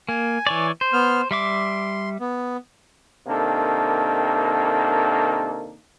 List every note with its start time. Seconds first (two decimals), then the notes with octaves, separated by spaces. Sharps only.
0.09 A#3 G#5
0.47 E3 C#5 D5
0.81 C5
0.93 B3 F6
1.31 G3 E5 C6 D6
2.20 B3
3.27 C3 D#3 A#3 D4 A4